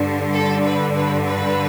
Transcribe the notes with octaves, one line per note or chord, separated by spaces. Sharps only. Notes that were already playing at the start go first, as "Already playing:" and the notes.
Already playing: G2 D3
A4
B4
B4
B4